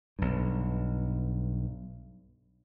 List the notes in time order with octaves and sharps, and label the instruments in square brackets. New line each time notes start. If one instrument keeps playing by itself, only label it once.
[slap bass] B1 G2